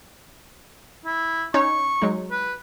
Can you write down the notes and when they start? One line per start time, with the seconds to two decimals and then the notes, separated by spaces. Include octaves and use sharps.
1.05 E4
1.54 C#4 D#4 C#5 C#6
2.02 F#3 G#3 D#4
2.31 B4